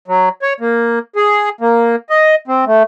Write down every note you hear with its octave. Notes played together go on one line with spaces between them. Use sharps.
F#3
C#5
A#3
G#4
A#3
D#5
C4
A3